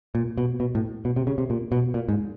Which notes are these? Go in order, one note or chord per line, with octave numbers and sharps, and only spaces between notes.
A#2
B2
B2
A2
B2
C3
C#3
C3
A#2
B2
A#2
G#2